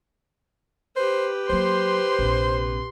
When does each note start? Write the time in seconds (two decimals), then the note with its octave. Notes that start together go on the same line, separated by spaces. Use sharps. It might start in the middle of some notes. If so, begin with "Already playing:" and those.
0.96 G4 B4 C5
1.49 F#3 A#3 C5 C6
2.19 A#1 C3